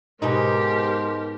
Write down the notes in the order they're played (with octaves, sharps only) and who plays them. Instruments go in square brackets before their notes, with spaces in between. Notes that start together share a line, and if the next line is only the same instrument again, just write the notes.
[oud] G#2 B2 D#4 [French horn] G#3 [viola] G4 A#4 [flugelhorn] C5